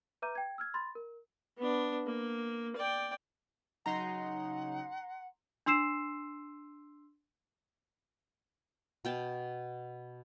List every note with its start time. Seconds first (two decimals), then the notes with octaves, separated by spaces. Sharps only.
0.22 B4 E5 A#5 D6 G6 D#7
0.35 G5 G#6
0.58 E6 F6 G#6
0.74 B5 C6 A6
0.95 A#4
1.57 B3 D4
2.06 A#3
2.76 D5 G5
3.86 C#3 F#3 D#4 F#5 A#5 C6
5.66 D4 C6 E6 C7 E7
9.05 B2 G5 A5